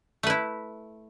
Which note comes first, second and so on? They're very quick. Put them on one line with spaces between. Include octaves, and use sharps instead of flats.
A3 B4 E4